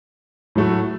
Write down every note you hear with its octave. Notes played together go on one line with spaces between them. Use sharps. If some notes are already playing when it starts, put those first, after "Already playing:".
A2 F#3 A3 F#4